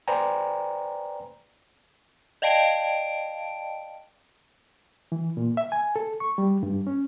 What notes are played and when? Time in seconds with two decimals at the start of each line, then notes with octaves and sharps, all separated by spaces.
0.08 B4 C5 D5 G5 G#5 A#5
2.42 D5 D#5 F5 G5 A5 D7
5.12 E3
5.37 A#2
5.57 E5
5.72 G#5
5.96 A4
6.20 C#6
6.38 G3
6.63 G2
6.87 C#4